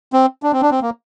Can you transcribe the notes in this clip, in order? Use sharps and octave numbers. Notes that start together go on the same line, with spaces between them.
C4
D4
C4
D4
C4
A#3